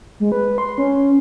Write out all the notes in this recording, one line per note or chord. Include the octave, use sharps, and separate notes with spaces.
G#3
B4
C6
C#4